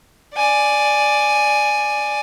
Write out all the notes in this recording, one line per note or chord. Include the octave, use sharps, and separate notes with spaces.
D5 G#5